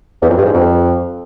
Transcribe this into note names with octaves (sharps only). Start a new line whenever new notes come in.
E2
F2
G2
G#2
F2